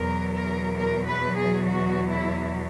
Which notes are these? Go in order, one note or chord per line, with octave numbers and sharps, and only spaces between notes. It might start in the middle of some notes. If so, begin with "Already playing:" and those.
Already playing: E2 B2 F#3 A#4
A#4
A#4
B4
G#4
F#4
E4